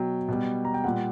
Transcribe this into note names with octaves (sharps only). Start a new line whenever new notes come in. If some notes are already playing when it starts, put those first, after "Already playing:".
Already playing: B2 F#3 G5
B2 G3
A#5
G5
A#2 G3 F#5